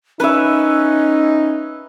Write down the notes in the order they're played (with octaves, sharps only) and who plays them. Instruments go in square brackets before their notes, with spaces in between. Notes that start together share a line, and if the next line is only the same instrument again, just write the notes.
[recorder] C#4 [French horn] D#4 [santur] B4 E5